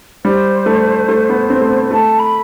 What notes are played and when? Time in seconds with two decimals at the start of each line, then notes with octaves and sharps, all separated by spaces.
0.24 G3 C5
0.66 A3
1.09 A3
1.29 B3
1.50 C4
1.60 A3
1.70 B3
1.91 A3 A5
2.19 B5